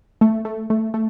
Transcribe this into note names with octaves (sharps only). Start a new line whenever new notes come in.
A3
A3
A3
A3